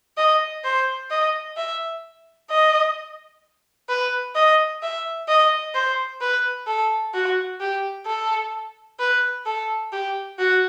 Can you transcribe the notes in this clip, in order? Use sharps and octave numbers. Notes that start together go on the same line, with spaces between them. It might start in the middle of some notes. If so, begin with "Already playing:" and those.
D#5
C5
D#5
E5
D#5
B4
D#5
E5
D#5
C5
B4
A4
F#4
G4
A4
B4
A4
G4
F#4